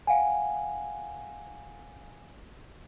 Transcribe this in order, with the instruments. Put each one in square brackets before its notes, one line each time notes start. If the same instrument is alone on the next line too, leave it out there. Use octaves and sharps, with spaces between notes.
[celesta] F5 F#5 G#5